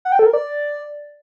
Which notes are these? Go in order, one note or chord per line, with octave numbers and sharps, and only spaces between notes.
F#5
G5
A4
A#4
D5